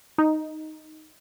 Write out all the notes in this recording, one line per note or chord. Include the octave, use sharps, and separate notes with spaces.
D#4